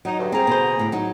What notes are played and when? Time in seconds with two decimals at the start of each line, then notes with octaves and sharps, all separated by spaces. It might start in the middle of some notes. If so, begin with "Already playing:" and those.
0.05 F#3 D#4
0.18 D2 G2
0.32 G3 C4 G#4 A#5
0.47 B2 D3 C5
0.79 A2 D3
0.92 F#3 D#4